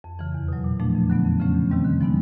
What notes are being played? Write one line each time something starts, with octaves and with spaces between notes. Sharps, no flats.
F2
C#3 E3
E2
B2 F#3
A#2
F3 A3 D4
F2
D3 F#3 B3
F2
C#3 F3 A3 C#4
E2
C3 D#3 G3 C4
D3
F3 G#3 B3 D#4